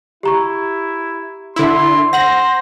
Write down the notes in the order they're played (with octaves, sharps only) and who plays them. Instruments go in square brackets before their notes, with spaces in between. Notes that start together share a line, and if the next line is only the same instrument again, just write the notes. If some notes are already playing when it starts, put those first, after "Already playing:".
[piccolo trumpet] E4 [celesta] G4 A#5 C#6
[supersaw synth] D3 E4 [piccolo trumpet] C6
[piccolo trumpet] C5 [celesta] F#5 F#7 [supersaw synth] A#6